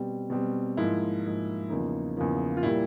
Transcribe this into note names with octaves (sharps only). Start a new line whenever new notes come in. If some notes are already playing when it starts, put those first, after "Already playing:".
Already playing: B2 G3 C4
B2 G3 C4
G#2 F3 A#3 E4
G#2 F3 A#3
E2 C#3 F3 A#3 D#4
E2 C#3 F3 A#3
F4
A#2 G3 A#3 E4